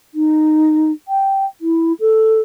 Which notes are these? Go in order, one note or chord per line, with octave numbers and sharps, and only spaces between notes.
D#4
G5
E4
A4